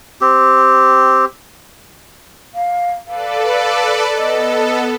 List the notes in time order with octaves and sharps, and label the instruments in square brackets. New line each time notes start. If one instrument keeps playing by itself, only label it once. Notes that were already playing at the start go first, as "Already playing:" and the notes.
[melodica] C4 G4
[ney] F5
[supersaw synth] A4 B4 D5 [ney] F5
[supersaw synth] B3 A4 [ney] D#5